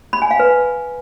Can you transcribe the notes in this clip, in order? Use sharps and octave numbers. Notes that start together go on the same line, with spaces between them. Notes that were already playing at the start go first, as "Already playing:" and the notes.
B5
G#5
F5
B4